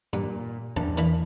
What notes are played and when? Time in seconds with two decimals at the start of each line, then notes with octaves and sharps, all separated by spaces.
0.13 G2 A#2
0.77 A#1 E2 D4 A5
0.97 A#2 E3 E5